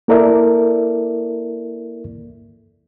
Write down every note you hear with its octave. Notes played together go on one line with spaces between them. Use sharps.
A#3 E4 A4 A#4 D5 E5